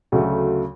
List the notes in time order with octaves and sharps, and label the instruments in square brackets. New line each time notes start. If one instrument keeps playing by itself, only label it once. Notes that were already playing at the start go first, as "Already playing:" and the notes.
[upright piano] D2 C#3 F#3 A3